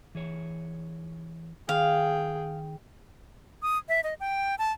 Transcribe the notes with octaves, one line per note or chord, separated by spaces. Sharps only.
E3 G#4 C#5
D#3 G#4 F5 G5
D#6
E5
D#5
G5
A5